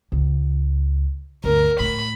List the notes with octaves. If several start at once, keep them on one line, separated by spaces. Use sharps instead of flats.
C#2
G1 D2 A#4
A2 B5